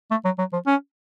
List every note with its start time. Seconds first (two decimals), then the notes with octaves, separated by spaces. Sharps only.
0.11 A3
0.25 F#3
0.39 F#3
0.53 F3
0.67 C#4